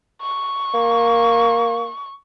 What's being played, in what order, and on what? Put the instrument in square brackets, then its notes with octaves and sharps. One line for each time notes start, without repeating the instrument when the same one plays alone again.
[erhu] C#6
[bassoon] A#3